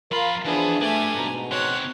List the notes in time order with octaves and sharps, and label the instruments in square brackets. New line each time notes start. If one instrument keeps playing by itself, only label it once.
[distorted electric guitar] F2 B5 [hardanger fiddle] F4 [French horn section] A#4 [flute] F5
[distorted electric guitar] E3 [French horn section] F3 D4 [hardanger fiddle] B3 G#4 [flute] A5
[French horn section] A3 [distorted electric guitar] D4 G4 [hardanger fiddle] G#5
[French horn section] G#2 B2 [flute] A#5
[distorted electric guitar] C4 F#4 [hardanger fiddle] C#5 [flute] F#6